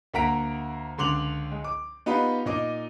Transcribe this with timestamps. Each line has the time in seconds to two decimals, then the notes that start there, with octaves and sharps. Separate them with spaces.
0.14 D2 A#3 F#5 A#5 B6 D7
0.98 C#2 D3 C6 D6 F7 F#7
1.52 G#3
1.64 D6
2.06 B3 D#4 F4 G4 B5
2.46 A#2 D#4 D#5 D6